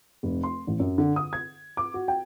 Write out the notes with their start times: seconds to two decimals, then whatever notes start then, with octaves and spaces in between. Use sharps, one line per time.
0.23 F1
0.44 C6
0.67 A1
0.80 F#2
0.98 D3
1.16 D#6
1.33 G#6
1.77 D6
1.94 F#4
2.08 G5